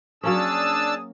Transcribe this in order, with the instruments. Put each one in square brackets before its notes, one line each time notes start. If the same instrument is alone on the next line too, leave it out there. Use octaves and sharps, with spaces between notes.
[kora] F#3 A#3 C#4 [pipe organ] D4 A5 E6 [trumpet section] G#4 D#6